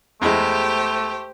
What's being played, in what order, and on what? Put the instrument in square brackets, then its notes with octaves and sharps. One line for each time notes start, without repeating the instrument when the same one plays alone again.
[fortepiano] E2 G#3 [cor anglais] A3 [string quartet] G4 C5